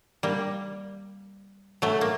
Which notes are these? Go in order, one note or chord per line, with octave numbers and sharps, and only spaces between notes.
G3 A#3
F#3 A3
A#3